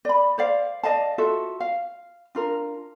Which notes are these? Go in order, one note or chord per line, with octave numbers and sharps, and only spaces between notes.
D5 B5
C5 D5 F5
D5 D#5 F5 A5
F4 F#4 A4 E5
F5
D4 F4 A#4